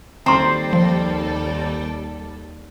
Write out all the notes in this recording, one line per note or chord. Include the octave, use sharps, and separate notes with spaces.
D#2 G3 C4 A4 A#5 C6
F3